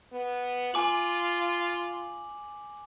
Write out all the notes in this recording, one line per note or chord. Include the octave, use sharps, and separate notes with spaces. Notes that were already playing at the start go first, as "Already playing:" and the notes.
B3
F4 G#5 D6 F#7